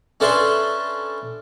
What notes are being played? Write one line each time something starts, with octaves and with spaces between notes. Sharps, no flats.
C#4 D4 A4 B4 E5 C6